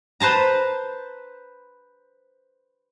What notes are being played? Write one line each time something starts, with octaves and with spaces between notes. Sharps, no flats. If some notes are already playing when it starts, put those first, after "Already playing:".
B4 C5 A5 A#5